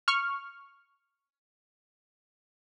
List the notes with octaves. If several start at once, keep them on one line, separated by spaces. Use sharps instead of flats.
C#6 F6